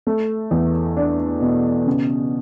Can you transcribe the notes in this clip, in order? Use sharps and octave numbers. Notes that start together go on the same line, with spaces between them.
A3
E2
D4
B2
C#3